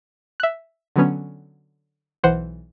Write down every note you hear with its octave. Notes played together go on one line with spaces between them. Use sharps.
E5 F#6
D3 F#3 B3 C#4
B1 E3 C5 F#5